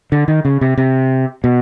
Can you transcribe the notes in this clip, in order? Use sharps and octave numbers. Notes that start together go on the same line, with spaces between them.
D3
D#3
C#3
C3
C3
B2